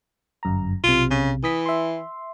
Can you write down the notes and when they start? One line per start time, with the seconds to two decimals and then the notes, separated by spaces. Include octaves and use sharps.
0.43 G1 F#2 A#5
0.84 B1 C3 F4
1.10 C#3
1.44 E3 D#6 B6
1.66 E5 C6